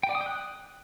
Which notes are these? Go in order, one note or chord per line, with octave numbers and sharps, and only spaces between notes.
G5
D5
D#6
G5
F#6